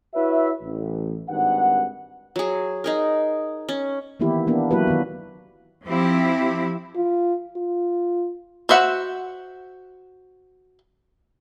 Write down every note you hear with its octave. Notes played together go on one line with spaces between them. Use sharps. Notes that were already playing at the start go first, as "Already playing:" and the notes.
E4 F#4 B4 C#5 E5
A1
G#1 G2 D#3 F#5
F#3 G#4
D#4 G#4 A#4
C#4
D#3 E3 A#3 B3 E4 G4
A#3 B3 D4
F#3 A#3 E4 F#4 G4 B4
D#3 B3
F3 C4 E4 G4
F4
F4
F#4 C5 E5 F#5